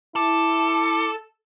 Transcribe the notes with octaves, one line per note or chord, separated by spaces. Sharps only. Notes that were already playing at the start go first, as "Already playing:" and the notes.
E4 A4 D6